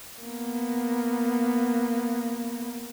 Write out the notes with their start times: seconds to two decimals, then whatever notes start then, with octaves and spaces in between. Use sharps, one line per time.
0.25 A#3 B3